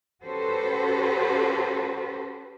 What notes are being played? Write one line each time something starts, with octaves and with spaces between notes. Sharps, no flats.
C#4 F#4 G4 A4 B4 C5